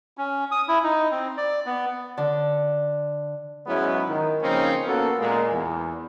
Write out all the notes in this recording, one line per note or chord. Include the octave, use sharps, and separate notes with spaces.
C#4
D#6
E4
D#4
C4
D5
B3
D3
G#2 F#3 G#3 B3 C#4 E4
D#3
C#3 F3 A#3 C4 C#4 D#4
A#3 B3 C#4 F#4 A4
A#2 G#3
E2